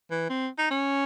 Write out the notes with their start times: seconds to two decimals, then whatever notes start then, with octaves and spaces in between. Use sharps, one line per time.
0.11 E3
0.29 C4
0.58 D#4
0.70 C#4